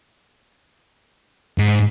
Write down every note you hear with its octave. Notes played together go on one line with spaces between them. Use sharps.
G#2